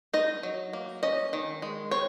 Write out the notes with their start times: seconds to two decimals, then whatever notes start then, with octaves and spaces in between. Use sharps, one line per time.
0.14 D#4 D#5
0.43 F#3
0.73 A#3
1.03 C#4 D#5
1.33 D#3
1.62 G#3
1.91 C4 C#5